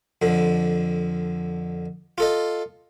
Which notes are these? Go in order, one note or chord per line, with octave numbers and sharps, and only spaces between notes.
F2 D3
F4 A4 D#5